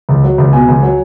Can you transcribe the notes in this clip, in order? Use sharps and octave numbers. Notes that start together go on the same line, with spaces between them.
C#2
F#3
C#2
B2 G#5
C#2
F#3